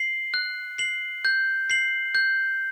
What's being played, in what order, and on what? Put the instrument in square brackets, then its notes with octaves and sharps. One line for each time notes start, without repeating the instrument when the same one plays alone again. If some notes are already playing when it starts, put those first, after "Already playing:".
Already playing: [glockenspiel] C7 F#7
F#6
C7 F#7
G6
C7 F#7
G6